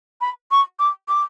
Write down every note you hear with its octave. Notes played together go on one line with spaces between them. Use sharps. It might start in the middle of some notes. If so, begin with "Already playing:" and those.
B5
C#6
D6
D6